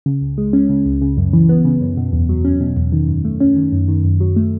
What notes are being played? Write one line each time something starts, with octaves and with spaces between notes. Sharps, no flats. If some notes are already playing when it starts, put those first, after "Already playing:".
C#3
C#2
G#3
C#4
C#3
C#2
C#3
F#2
E3
B3
C#3
F#2
B2
E2
F#3
C#4
B2
E2
D#3
F#2
A3
C#4
D#3
F#2
D#3
F#2
F#3
A3